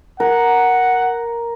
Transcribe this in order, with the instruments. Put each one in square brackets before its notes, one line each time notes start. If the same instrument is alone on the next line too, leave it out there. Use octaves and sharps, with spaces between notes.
[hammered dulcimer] A#4 [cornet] F#5